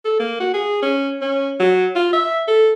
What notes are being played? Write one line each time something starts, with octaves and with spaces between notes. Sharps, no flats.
A4
A#3
F#4
G#4
C#4
C#4
F#3
F4
E5
A4